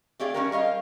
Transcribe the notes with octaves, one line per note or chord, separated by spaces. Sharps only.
A3 C4 G4 G#4 D5 F5
G3 C#4 D4 F#4 G#4 A#4
G3 D#5 F5